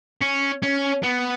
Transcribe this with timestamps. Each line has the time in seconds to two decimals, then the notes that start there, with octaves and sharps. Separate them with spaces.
0.22 C#4
0.62 C#4
1.03 B3